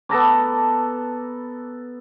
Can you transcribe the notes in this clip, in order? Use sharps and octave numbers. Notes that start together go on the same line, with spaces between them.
B3 A4 A#5 D6